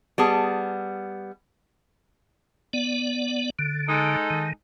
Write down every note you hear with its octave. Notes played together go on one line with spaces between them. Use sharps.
G3 B3 G#4 A5
B3 D5
D3
G#3 D#4 A4
D#3